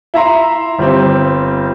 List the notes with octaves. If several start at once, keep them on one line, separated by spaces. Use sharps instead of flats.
E4 E5 A#5 C6
G1 G3 C4